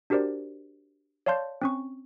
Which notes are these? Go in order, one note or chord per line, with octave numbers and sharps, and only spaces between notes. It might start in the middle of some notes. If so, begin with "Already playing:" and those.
D4 F#4 G4 A#4 C5 D5
C#5 D5 F5 A5 C6 G6
C4 C#4 C#6